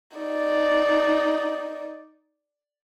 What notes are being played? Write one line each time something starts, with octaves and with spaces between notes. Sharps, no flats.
D#4 D5